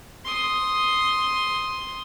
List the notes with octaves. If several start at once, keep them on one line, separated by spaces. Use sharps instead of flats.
C6 D#6